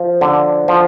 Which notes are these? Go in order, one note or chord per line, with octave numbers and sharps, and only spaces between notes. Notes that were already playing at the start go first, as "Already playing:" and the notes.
Already playing: F3
D3
F3